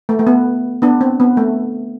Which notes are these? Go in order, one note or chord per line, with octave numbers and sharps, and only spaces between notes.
A3
A3
B3
B3 D4
C4
B3
A3